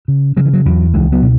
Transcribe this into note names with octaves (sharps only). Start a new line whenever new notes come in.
C#3
C#3 F#3
E3
F#3
E2 F#3
C#2 E3 G#3
F#3 B3
B2